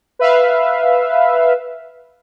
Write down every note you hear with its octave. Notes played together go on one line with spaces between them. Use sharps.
B4 E5 F5